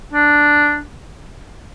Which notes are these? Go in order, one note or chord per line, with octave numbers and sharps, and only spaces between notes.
D4